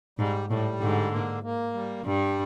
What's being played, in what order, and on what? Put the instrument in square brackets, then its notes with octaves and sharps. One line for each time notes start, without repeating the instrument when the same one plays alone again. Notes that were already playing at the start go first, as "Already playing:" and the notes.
[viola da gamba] G#2 [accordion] G3
[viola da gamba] A2 [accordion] G3
[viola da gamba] G#2 [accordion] D3
[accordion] A#3
A#3
G3
[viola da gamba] G2 [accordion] G3